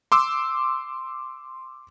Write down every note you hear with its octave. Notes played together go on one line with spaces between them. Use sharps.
C6 D6 E6